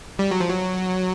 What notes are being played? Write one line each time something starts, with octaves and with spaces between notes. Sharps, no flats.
G3
F#3
F3
F#3